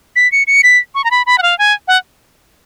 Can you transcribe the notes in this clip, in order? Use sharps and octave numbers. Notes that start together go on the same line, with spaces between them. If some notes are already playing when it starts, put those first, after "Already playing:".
B6
C#7
C#7
B6
C#6
A#5
B5
B5
F#5
F5
G#5
F#5